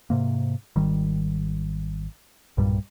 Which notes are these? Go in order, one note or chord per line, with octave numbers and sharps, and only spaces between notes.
G#2 C3 A#3
G#1 D#3 G3
B1 G2 A#2 G3